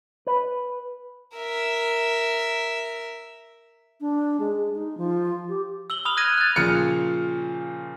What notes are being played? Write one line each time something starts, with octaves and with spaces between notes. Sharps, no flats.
B4
A#4 E5
D4
G#3
D#4
F3
G4
E6 F#7 G7
B5 D#6 F6 F7
F6 F#6 G#6 A#6 D#7 F7
F#6 A6
A#2 C#3 F3 F6 C#7